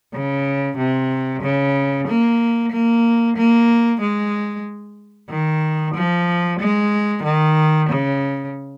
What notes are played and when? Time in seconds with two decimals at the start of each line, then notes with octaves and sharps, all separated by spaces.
0.14 C#3
0.78 C3
1.42 C#3
2.08 A#3
2.72 A#3
3.37 A#3
4.01 G#3
5.30 D#3
5.95 F3
6.60 G#3
7.24 D#3
7.89 C#3